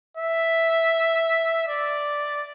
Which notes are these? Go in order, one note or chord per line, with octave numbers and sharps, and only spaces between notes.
E5
D5